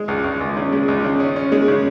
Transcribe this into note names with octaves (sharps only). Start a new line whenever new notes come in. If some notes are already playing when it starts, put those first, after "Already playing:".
Already playing: G#3
C#2
C#2
C#2
C#3
G#3
C#2
C#3
C#4
C#4
G#3
C#3